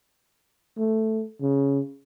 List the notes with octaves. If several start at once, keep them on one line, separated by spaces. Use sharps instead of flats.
A3
C#3